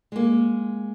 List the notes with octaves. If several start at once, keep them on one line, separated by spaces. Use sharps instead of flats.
G#3 A#3